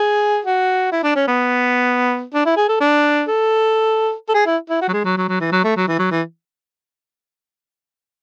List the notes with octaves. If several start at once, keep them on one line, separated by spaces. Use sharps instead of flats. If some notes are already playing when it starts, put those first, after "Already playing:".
Already playing: G#4
F#4
E4
D4
C#4
B3
D4
E4
G#4
A4
D4
A4
A4
G#4
E4
E4
F#4
F#3
G#3
F#3
F#3
F#3
E3
F#3
A3
F#3
E3
F#3
E3